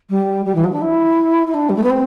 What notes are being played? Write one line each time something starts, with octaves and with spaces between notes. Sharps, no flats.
G3
G3
E3
F#3
D4
E4
E4
D4
G3
A3
B3
C4